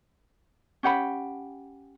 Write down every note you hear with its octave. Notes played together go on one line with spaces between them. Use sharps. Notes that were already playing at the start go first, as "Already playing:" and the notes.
C#4 G4 F#5 B5